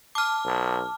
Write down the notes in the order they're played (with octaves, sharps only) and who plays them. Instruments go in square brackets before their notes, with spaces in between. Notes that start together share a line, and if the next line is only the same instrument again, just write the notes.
[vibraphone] A5 [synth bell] D6 F6
[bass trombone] B1